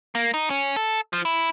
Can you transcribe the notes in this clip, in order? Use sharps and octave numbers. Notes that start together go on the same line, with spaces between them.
A#3
D#4
C#4
A4
F3
E4